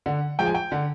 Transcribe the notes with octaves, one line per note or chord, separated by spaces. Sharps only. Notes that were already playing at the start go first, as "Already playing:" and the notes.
D3 F#5
F3 G#3 G5
G#5
G5
D3 F#5